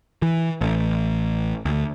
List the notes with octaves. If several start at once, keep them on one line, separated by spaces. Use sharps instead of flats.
E3
A1
D2